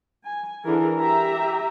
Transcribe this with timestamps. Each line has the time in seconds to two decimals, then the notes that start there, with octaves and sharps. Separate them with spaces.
0.25 G#5
0.64 D3 E3 G#4 A#4
0.98 G4 E5 A#5